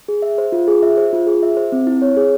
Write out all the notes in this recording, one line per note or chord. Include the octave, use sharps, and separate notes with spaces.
G#4
E5
C5
F4
G#4
E5
C5
F4
G#4
E5
C5
C4
E4
C#5
G#4